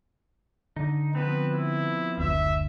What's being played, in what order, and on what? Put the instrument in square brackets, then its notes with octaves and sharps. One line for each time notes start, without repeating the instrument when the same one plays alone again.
[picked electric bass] D3 [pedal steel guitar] D#4
[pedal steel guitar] F3 B3 C4 [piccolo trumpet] B4
[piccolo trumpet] E4
[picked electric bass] F#1 D2 [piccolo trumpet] E5